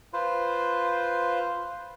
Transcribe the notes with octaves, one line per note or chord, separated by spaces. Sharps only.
F4 B4 C5